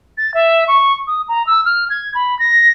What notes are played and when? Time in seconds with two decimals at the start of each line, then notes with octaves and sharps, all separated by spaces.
0.18 A6
0.34 E5
0.68 C#6
1.07 D#6
1.28 A#5
1.47 E6
1.65 F6
1.90 G#6
2.15 B5
2.39 A#6